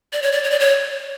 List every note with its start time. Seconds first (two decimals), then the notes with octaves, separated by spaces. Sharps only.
0.13 D5
0.22 C#5
0.32 D5
0.43 C#5
0.50 D5
0.60 C#5